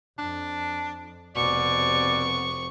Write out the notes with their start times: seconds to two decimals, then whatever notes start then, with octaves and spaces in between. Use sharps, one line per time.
0.19 F2 D4
1.36 F1 B2 C4 D5 C#6